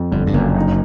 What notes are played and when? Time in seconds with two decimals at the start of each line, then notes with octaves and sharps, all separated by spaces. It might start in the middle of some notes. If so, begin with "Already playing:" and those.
Already playing: F2 F3
0.11 G1 G2 D3
0.27 G2
0.33 F#1 F#2 A#3
0.56 D#4